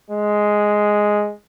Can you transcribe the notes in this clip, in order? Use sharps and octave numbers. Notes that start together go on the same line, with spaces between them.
G#3